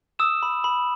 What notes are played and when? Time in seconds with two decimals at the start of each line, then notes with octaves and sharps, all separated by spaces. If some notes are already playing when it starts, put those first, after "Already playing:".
0.19 D#6 E6 E7
0.43 B5
0.64 B5